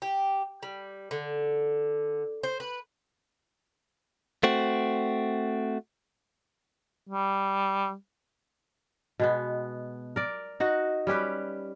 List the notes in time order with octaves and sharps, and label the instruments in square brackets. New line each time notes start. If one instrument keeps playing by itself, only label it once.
[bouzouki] G4
G3
D3
C5
B4
[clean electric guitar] A3 C4 F#4
[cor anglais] G3
[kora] B2 G#3 B3
A#4 D5
D#4 F#4 F#5
G3 C#4 G4 B4